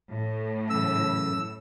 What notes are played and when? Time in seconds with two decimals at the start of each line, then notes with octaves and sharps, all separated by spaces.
0.13 A2
0.70 F#2 C#3 E3 E6